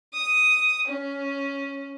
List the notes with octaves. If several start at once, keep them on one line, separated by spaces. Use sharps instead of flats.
D#6
C#4